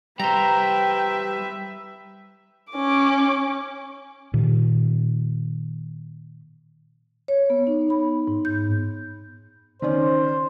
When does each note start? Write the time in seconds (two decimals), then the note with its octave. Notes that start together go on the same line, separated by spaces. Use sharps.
0.20 G3 B4 C5 E5 G5 A#5
2.72 C#4 D6
4.34 A#2 D#3
7.28 C#5
7.50 B3
7.67 D#4
7.90 B5
8.27 G#2
8.45 G6
9.82 D#3 C#4 C5 D5